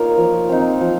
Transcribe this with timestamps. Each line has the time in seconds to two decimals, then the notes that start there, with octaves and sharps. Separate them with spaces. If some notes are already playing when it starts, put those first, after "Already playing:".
Already playing: A#3 D#4 F4 A#4 C#5
0.17 F3
0.49 C4 D#4
0.81 F3